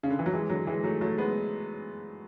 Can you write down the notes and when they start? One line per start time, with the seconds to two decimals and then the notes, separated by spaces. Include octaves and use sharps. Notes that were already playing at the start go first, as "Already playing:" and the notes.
0.03 C#3
0.10 D3
0.19 E3
0.26 F#3
0.33 E3 G#3
0.50 D3 F#3
0.67 E3 G#3
0.84 F#3 A3
1.01 F#3 A3
1.18 G#3 B3